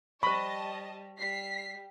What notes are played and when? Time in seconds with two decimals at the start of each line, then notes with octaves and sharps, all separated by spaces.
0.23 G3 C5 D#5 A5 B5 C#6
1.19 G3 B6 C7